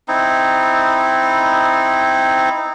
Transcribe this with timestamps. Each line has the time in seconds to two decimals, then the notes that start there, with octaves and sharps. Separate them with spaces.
0.08 C4 D#4 E4